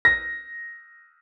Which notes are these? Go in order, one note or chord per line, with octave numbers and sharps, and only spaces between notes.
A#6